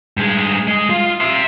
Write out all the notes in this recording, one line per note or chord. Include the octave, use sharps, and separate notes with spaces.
G2 G#3
G#3
F4
E5 C6